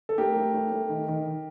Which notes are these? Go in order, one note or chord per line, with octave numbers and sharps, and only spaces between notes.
A4
A3 G4 A#4
A3
A3
A3
D#3
D#3
D#3